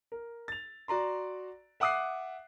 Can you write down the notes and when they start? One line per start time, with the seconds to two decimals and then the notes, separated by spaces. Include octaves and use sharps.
0.12 A#4
0.48 A6 F7
0.88 F#4 D5 A#5 C6
1.80 E5 F#5 D6 D#6 F#6 C7